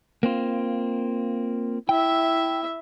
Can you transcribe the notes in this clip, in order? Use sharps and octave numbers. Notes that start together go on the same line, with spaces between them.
A#3 C4 F4
E4 E5 G5